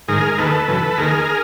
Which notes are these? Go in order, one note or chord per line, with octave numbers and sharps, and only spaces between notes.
G#2 D#3 G#4 A#4
D#2 D#3 A4 B4
F#2 C#3 E3
D#2 D#3 G#4 A#4